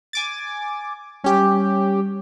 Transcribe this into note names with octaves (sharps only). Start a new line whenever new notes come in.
G#5 D6 A6
G3 C#4 G4